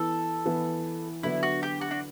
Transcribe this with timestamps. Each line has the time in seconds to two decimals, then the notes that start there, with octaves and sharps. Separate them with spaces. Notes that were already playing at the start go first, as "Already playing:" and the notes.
Already playing: E3 B3 E4 A4
0.46 E3 B3 E4
1.23 D3 F#3 B3 D4 E4
1.43 F#4
1.63 G4
1.81 F#4
1.91 D4